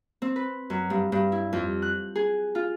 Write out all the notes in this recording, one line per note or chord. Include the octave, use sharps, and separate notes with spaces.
C4
B4
F#2
G2
G2
E4
F2
F#6
G#4
F4